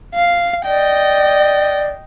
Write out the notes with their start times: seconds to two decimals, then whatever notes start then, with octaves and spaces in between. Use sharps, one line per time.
0.15 F5
0.66 D5 D#5 G5